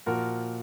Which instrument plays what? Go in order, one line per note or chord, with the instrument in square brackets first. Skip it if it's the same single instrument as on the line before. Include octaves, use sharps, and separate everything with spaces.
[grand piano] A#2 F3 F#4 A#4